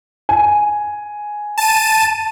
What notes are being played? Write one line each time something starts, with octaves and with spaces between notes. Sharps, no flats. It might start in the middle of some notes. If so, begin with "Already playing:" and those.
G#5
A5 D#7